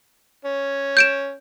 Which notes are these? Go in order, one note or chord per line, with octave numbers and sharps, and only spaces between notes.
C#4
G6 D7 E7